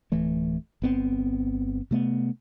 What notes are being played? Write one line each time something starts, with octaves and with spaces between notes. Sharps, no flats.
D1 E3 A3
G1 B3 C4
C3 A3 B3